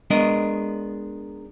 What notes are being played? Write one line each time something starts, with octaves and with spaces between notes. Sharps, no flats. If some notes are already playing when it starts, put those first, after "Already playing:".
G#3 B3 D4 A#4 D#5